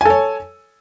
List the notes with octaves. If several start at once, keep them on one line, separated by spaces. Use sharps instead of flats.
A4 C#5 G#5